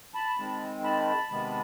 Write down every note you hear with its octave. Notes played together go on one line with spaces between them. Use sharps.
A5 B5
D#3 G#3 C4
A5 B5
C3 D#3 G#3 B3